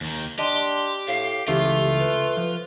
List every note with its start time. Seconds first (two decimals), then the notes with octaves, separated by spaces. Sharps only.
0.01 D#2 D#3
0.39 D4 G4 D#5 C6
1.07 A2 F5
1.48 C#2 C#3 E3 A3 F4 G4
1.98 B4
2.37 F3